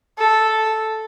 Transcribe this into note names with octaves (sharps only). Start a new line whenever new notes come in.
A4